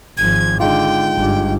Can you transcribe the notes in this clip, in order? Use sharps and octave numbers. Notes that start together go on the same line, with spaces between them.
G#1 F3 G#6
D3 G#3 D#4 F4 G5
G1 G2